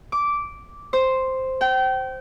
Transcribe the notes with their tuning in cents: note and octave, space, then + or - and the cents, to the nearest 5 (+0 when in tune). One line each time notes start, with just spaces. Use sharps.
D6 -10
C5 +0
G5 -30